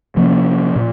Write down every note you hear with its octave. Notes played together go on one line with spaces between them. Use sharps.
C3 F3 A#3 C#4
A#2